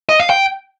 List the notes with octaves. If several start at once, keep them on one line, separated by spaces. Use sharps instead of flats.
D#5
F5
G5